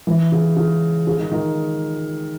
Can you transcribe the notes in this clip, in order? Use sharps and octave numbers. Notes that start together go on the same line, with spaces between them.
E3
C#3
C#3
C#3
D#3
D#3